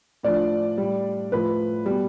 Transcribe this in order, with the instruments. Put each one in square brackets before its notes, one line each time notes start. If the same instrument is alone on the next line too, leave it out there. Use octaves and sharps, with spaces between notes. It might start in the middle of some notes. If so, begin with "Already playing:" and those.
[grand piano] A2 F3 D4 D5
A2 G3
A2 F3 B4
B2 G3